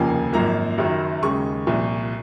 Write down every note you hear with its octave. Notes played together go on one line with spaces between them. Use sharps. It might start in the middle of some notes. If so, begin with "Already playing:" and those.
Already playing: F1 D#2 C#3 F3 A#3 G#5
G#1 F#2 F3 A#3 A#5
F#1 F#2 D#3 F#3
D#2 C#3 G#3 C#6
C2 A#2 F3